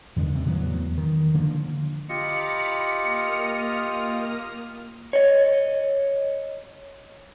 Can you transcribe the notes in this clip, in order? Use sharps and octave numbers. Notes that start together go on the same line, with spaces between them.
E2 D3 D#3 G#3
C3
E2 A2 F#3 B3
D#3
D3 F3 A#3
F4 G4 D#5 A#5 B5 D6 C#7
A#3 D#6 F6
C#5 D#5